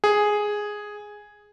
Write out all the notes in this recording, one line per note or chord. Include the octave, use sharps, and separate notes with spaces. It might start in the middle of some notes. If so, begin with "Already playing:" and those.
G#4